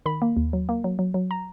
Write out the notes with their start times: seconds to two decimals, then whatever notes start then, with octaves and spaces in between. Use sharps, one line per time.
0.06 D#3 B5
0.22 A#3
0.37 D#2
0.53 F#3
0.69 A#3
0.84 F#3
0.99 F#3
1.14 F#3
1.31 A#5